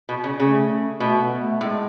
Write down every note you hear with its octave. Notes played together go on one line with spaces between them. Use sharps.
B2
C#3
C#3 A3
B2 A3
B3
A3
A2 G#3